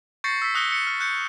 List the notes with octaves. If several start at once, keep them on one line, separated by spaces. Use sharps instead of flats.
C#6 G6 A6 A#6 C7 C#7
E6 B6
D#6 F#6 A#6 C#7 G7
C#7
F6
F#6 G6 C#7